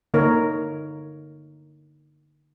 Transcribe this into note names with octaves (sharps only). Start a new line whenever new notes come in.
D3 A#3 D#4 A#4 C#5